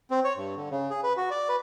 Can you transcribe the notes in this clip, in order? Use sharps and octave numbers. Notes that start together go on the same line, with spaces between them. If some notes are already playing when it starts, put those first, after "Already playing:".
C4
C#5
G2
D3
C#3
G#4
B4
F#4
D5
B4